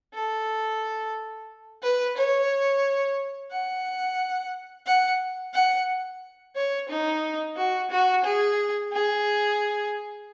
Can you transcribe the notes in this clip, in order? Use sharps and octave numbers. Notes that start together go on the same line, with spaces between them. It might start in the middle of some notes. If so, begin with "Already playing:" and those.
A4
B4
C#5
F#5
F#5
F#5
C#5
D#4
F#4
F#4
G#4
G#4